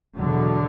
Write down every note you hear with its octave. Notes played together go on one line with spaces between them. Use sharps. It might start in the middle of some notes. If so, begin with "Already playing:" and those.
E2 B2 D3 F#3